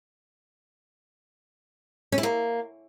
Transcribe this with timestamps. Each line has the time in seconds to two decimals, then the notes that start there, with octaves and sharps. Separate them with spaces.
2.12 C#4
2.18 E4
2.23 A#3